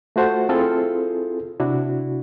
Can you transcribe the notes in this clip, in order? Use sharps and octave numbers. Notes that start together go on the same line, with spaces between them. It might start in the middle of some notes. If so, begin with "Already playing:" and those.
A3 F4 F#4 C5 F#5 A5
C4 E4 F4 G#4 A4
C3 D4 E4 F#4